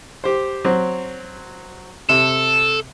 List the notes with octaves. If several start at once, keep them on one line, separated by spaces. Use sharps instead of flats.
G4 C5
F#3 C4
C3 A4